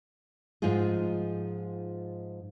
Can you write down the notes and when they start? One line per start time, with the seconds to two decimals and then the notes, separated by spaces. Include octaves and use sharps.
0.62 G#2 F3 D#4 F4 G#4